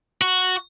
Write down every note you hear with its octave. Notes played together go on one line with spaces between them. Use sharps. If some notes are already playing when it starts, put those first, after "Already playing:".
F#4